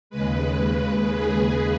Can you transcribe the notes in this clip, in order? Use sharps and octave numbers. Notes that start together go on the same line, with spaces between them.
D#2 C#3 G#3 B4
G#4